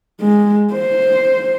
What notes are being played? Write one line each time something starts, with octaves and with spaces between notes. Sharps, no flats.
G#3
C5